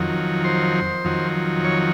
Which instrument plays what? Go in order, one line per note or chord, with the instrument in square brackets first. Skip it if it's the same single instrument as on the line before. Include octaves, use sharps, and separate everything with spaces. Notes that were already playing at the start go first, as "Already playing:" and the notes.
Already playing: [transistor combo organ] F2 D#3 F#3
C5
F2 D#3 F#3
C#5